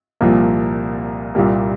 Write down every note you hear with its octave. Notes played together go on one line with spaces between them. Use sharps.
C2 A#2 F3 A#3
C2 A#2 G3 A#3